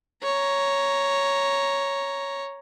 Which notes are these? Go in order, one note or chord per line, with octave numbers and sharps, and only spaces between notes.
C#5 A#5